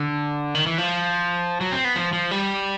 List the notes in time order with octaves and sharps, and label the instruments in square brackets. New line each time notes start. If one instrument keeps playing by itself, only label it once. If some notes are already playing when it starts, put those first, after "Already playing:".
Already playing: [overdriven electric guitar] D3
D#3
E3
F3
F#3
C4
B3
F3
F3
G3